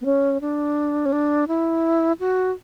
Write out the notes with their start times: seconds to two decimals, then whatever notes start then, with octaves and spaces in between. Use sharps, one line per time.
0.01 B3
0.05 C#4
0.41 D4
1.06 C#4
1.12 D4
1.48 E4
2.20 F#4